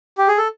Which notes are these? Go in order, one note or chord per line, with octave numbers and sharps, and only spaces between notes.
G4
G#4
A4